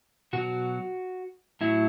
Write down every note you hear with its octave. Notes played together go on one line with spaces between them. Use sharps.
B2 F#3 F#4
A2 F#3 E4